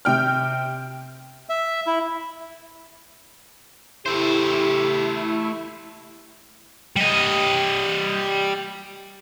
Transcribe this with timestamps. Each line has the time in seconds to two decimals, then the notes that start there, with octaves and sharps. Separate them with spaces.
0.05 C3 G5 F6
1.49 E5
1.87 E4
4.06 A3 E4 G4 C5
6.96 G3 D#5